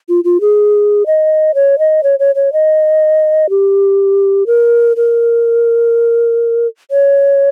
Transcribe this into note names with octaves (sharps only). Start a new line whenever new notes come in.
F4
F4
G#4
D#5
C#5
D#5
C#5
C#5
C#5
D#5
G4
A#4
A#4
C#5